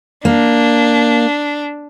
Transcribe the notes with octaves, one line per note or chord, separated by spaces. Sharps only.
A#3 D4